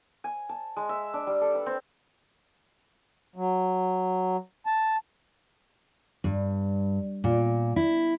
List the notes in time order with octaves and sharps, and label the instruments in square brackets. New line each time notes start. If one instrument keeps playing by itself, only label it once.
[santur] G#5
A5
G#3
E5
D4
G3
A4
B4
C4
[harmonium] F#3
A5
[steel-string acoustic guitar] G2
A#2
E4